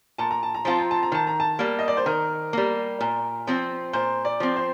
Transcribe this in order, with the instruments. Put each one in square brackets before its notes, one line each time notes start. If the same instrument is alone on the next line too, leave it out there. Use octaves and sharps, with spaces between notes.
[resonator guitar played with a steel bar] A#2 [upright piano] A5
[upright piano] A#5
A5
A#5
[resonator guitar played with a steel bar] F3 C4 F4 [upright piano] A5
[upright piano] A#5
A5
A#5
[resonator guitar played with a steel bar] D#3 [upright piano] A5
[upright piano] A#5
A5
[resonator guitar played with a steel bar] G3 A#3
[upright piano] D#5
D5
C5
[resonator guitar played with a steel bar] D#3 [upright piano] A#4
[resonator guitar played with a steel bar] G3 A#3
A#2
F3 C4
[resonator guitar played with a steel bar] A#2 [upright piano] C5
[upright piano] D5
[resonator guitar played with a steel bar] F3 C4
[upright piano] C5